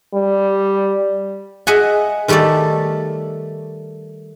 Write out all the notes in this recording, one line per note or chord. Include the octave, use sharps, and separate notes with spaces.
G3
G#4 D#5 E5 F#5 G#5
D#3 G3 A3 G4 A4 D5